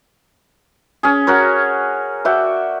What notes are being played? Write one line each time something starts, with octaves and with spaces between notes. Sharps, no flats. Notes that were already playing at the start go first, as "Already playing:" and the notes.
C#4 G#4
F#4 A#4 C#5
F#4 D5 E5 G5